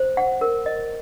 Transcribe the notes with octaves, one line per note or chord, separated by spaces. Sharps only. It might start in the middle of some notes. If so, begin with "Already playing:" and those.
Already playing: C5
F#5
A#4
D#5